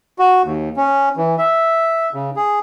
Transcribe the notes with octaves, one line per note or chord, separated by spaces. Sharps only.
F#4
D#2
C#4
E3
E5
C#3
G#4